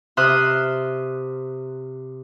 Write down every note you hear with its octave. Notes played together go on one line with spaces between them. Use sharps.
C3 E5 C6 D#6 F6 F#6